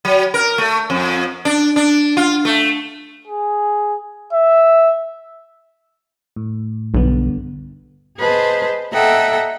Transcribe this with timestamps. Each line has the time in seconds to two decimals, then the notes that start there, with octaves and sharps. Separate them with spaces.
0.05 F#3
0.34 A#4
0.58 A3
0.90 F2
1.45 D4
1.76 D4
2.17 F4
2.45 A3
3.27 G#4
4.33 E5
6.36 A2
6.94 B1 G2 D3 B3
8.19 G#4 B4 C5 D#5 A5
8.93 A4 D#5 E5 F#5 G5 A#5